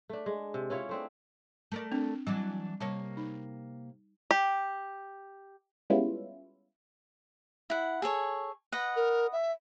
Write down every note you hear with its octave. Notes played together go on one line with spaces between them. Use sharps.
A3 D4
G#3
C3
C#4 E4 F4 C#5
A3 C4 D4
A3 A#4 D5
C4 D4
E3 F#3 G3 D4
C3 G3 A#3 C#5 A5
D#4
G4
G3 G#3 B3 C#4 E4 F4
E4 F#5
G#4 A4 C#5
B4 D#5 F#5
A#4
E5